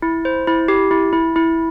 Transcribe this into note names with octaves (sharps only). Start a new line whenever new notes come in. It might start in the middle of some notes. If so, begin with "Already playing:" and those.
E4
C5
E4
G4
E4
E4
E4